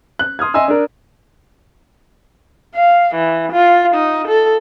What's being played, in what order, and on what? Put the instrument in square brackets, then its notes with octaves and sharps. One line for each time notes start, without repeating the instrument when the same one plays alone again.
[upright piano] F#6
C6 D#6 F6 G#6
D#5 E5 G#5 C6 E6
D4 A#4
[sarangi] F5
E3
F4
D#4
A4